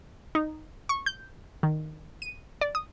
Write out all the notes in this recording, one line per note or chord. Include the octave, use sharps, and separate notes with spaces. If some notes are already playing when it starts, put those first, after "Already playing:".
D#4
C#6
G6
D#3
D#7
D5
D#6